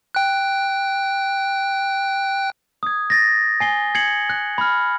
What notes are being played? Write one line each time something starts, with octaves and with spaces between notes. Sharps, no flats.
G5 F#6
D#6 G#6
A6 A#6
G#5 C7 G7
G#6 C7 C#7 F#7
F#6
B5 F6